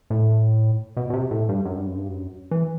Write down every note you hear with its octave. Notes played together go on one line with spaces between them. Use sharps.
A2
B2
B2
C3
A2
G2
F#2
G2
F#2
G2
F#2
E3